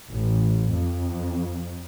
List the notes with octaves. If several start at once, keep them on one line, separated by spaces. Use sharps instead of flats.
A1
F2